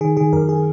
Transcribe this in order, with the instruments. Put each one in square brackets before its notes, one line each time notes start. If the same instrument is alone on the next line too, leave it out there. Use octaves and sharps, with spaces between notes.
[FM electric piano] D#3 G#4
D#3 G#4
F#2 A#4
G#4